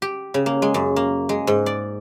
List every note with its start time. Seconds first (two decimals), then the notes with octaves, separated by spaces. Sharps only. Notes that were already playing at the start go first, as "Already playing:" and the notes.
0.02 G4
0.34 C#3
0.46 A#3
0.62 G#3
0.74 F#2
0.96 A#3
1.29 G#3
1.47 G#2
1.66 D5